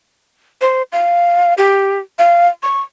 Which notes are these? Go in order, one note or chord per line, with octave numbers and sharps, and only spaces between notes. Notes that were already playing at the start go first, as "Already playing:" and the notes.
C5
F5
G4
F5
C#6